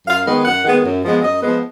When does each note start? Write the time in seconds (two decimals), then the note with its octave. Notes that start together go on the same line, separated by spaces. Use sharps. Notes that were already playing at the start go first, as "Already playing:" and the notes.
0.07 F#2 F5
0.26 D#3 G#3 B3
0.45 F#2 F#5
0.64 D#3 G#3 B3
0.84 F#2
1.04 F3 G#3 B3
1.23 F#2 D#5
1.42 F3 G#3 B3